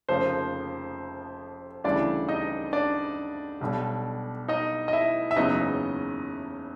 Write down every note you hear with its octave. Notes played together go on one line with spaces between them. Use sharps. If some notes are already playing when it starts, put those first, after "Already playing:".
F1 F2 C#3 F3 A#3 C5
D2 C#3 E3 G3 D4 D5
D#4 D#5
D4 D5
B1 B2 G3
D#4 D#5
D#5
E4 E5
E5
F#1 E2 C#3 F#3 B3 D#4 D#5